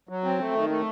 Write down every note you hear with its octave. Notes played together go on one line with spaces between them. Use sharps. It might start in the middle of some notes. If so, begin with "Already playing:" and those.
F#3
C4
A3
D#3
A3